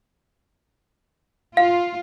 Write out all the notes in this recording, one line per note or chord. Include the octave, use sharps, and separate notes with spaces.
F4 F5